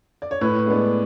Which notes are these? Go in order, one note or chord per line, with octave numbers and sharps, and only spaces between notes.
D5
C#5
A2 B4
G#3 B3 D4